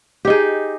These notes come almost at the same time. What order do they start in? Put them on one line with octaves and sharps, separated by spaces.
G4 D#4 G#4